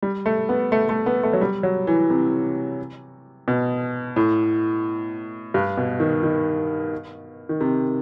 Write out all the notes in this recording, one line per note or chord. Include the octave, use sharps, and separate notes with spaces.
G3
A3
B3
A3
A3
B3
A3
F#3
G3
F#3
E3
C3
B2
A2
G2
B2
D#3
D#3
D#3
C3